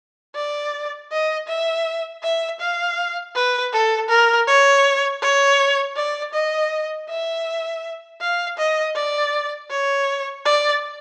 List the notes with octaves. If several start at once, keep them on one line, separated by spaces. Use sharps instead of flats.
D5
D#5
E5
E5
F5
B4
A4
A#4
C#5
C#5
D5
D#5
E5
F5
D#5
D5
C#5
D5